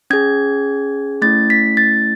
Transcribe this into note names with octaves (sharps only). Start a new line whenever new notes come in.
C#4 G#4 G#6
A3 C#4 E4 A6
B6
A6